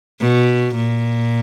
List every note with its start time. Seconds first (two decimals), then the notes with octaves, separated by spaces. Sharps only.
0.20 B2
0.75 A#2